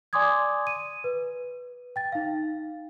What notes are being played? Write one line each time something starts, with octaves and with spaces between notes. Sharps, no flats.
D5 G#5 C6 D6 D#6 G#6
D#7
B4
G5 A6
D#4 F5